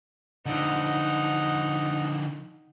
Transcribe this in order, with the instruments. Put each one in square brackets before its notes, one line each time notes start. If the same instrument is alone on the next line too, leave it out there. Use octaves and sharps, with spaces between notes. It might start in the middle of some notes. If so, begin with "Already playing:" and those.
[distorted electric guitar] D3 F3 [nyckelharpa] D#4 F#5